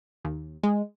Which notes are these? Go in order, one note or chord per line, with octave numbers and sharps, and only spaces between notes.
D#2
G#3